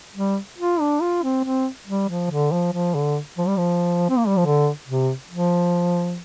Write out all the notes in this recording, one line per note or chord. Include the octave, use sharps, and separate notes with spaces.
G3
F4
D4
F4
C4
C4
G3
F3
D3
F3
F3
D3
F3
G3
F3
C4
A#3
G3
F3
D3
C3
F3